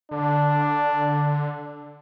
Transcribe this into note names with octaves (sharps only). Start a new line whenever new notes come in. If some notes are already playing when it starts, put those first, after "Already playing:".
D3 D4